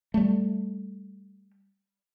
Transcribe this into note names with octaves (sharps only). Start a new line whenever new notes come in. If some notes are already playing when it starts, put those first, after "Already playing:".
G3 A3